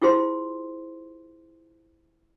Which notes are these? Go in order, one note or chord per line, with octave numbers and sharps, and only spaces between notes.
E4 F4 G#4 C5 C6